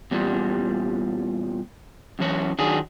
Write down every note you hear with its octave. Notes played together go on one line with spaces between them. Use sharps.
E2 A#2 G3
F#2 E3 C#5
D#3 F#3 D4 G#4